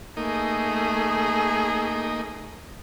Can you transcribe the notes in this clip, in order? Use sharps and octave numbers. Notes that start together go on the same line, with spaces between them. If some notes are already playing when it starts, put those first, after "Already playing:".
A3 A#3 D#4 G#4